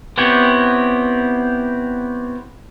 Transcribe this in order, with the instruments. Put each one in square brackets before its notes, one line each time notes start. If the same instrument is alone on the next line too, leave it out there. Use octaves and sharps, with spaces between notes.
[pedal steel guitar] B3 C4 E4 G4 C#5